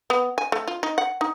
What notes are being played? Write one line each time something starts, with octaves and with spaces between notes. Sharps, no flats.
B3
G#5
A3
F4
D#4
F#5
D#4